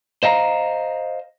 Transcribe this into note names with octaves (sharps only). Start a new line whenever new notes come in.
C5 D#5 F5 A#5